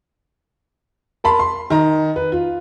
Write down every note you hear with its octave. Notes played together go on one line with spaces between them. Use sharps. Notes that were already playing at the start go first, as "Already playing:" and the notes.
A#4 A5 B5 C6
C6
D#3 A#5
B4
F4